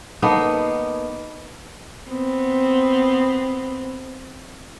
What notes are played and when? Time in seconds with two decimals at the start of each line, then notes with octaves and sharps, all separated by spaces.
0.22 A#3 B3 D#4 A4
2.10 B3 C4